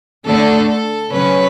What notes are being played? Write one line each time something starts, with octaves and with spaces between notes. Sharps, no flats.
D3 A3 D4 A4
A4
C#3 F#3 C#4 B4